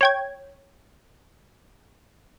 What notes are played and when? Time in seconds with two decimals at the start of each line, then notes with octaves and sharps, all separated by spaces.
0.01 C#5 G5 G#6